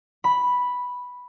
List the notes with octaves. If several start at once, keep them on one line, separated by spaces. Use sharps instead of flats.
B5